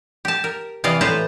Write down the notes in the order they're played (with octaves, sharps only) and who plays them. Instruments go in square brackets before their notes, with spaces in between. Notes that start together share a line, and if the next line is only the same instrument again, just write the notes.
[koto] G4 A5
A#4
C3 E3 D5 D#5 F5
A2 B4 C5 A5 A#5